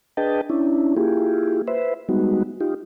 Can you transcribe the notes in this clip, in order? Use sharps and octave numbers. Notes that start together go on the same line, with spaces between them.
D4 G#4 B4 D#5 G5 A5
C#4 D4 E4
A#3 E4 F4 G4 G#4
B4 C5 E5
G3 G#3 B3 D#4 F#4
D#4 F4 G4